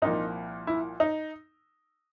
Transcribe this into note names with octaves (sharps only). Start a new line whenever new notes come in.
C2 A#2 F3 D#4
E4
D#4